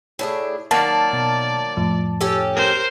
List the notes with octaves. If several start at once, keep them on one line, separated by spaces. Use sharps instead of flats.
A2 D4 G#4
D#3 F#3 A#3 D5 A5
B2
F2 A2 F3
C#4 G4 A4
A#4 C5